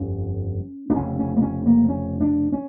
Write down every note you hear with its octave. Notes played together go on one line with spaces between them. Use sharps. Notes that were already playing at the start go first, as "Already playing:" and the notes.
Already playing: G1 F2 D3 C#4
D4
F1 F2 C#3 C#4
C#4
A#3
C#4
A#3
C#4
D4
C#4